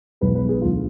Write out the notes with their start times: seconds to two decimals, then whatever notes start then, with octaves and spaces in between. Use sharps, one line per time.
0.21 B1 B2 G#3 B4
0.35 B4
0.49 G#4
0.62 D2 D3 F4